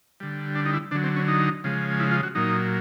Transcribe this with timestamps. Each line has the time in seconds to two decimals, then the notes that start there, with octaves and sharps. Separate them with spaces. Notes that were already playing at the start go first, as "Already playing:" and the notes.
0.20 D3 G3
0.55 D4
0.66 D#4
0.73 E4
0.91 D3 F#3 D4
1.04 C4
1.16 C#4
1.28 D#4
1.64 C#3 F3 G#3
2.00 E4
2.11 F4
2.23 F#4
2.35 A#2 F#3 D#4